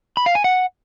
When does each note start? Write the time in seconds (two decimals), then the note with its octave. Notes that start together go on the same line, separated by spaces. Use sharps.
0.17 B5
0.26 F5
0.35 G#5
0.44 F#5